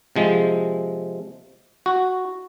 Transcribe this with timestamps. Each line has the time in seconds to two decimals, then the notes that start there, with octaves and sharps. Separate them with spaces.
0.16 C3 F3 G#3
1.86 F#4